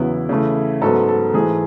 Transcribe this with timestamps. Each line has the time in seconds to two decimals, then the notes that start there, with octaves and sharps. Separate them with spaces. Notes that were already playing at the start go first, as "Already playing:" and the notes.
Already playing: E2 C#3 F#3 B3 E4
0.29 C#3 E3 A3
0.81 G#2 F#3 B3 A4
1.08 A4
1.34 G#2 E3 A3 G#4